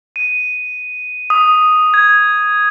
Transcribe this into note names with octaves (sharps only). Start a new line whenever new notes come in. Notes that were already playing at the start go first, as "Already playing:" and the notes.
D#7
D#6
G#6